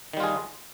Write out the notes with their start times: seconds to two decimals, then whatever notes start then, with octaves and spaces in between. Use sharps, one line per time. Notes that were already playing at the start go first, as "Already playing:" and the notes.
0.13 D#3
0.17 G3
0.20 F4
0.24 G#4